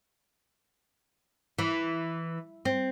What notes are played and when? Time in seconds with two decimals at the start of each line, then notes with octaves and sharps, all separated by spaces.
1.59 E3
2.65 C4